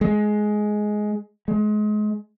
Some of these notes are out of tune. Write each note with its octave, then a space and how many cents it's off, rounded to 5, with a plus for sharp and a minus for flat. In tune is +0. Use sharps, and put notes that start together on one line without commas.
G#3 +15
G#3 +30